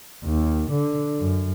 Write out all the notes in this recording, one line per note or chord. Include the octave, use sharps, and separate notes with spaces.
D#2
D3
F#2